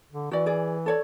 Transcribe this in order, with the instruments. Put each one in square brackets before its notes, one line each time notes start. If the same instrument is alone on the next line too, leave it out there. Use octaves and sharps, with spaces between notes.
[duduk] D3
[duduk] E3 [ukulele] F#4 D5
[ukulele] G#4 D5
A4 C#5 D5